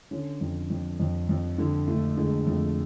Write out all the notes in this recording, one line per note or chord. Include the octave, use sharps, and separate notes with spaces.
D3 C#4
F2
F2
F2
F2
D3
D3 A3
D3 G#3
F2 A3